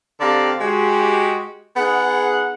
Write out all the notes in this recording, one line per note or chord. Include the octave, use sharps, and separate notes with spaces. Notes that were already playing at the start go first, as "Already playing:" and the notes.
D3 C4 G4 D5 F5 A#5
G#3 F#4 G4
B3 D#4 G#4 F#5